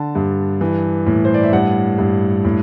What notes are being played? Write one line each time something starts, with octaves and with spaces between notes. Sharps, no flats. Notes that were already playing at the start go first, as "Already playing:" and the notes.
Already playing: D3 A5
G2
E3
A2
C5
D5
E5
G2 F#5
G2
A2